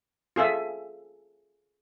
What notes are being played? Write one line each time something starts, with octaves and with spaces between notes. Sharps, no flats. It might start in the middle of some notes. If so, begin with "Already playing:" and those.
F4 G#4 A4 E5